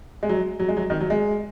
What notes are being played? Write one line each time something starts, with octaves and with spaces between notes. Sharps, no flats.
G#3
F#3
F#3
G#3
F#3
D#3
F#3
G#3